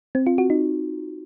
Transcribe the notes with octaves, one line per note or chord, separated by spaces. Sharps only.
C4
F4
F#4
D#4